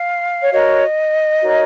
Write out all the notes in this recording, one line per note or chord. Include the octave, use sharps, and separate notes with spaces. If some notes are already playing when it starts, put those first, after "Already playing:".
Already playing: F5
C#5
F#4 A#4 C#5 D#5
D#4 F#4 A#4 C#5